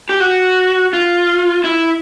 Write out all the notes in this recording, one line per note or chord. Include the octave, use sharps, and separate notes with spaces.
G4
F#4
F4
E4